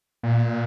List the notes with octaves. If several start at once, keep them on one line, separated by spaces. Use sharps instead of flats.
A#2